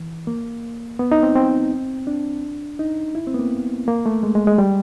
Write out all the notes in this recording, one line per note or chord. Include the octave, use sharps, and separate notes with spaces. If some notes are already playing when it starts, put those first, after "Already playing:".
Already playing: E3
A#3
B3
D#4
C4
C4
D4
D#4
E4
C4
B3
A#3
A#3
A3
G#3
G#3
G#3
G3